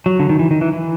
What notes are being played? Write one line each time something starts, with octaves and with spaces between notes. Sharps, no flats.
F#3
D3
D#3
E3
D#3
E3
E3